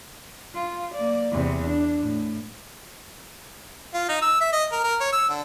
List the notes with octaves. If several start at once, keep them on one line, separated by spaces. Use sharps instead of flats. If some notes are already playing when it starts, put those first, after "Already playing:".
F4
A#3 D5
E2 C3
D4
A2
F4
D#4
E6
E5
D#5
A#4
A#4
C#5
E6
D3